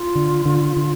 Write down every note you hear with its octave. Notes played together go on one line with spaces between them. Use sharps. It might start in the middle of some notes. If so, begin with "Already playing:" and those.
Already playing: F4
D3
D3
D3